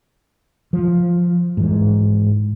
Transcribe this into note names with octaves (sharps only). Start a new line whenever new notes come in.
F3
G#2 E3